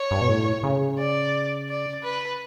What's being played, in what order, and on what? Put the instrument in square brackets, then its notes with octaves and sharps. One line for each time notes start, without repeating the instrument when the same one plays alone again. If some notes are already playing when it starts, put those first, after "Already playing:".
Already playing: [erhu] C#5
[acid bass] G2
B2
A2
C#3
[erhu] D5
D5
B4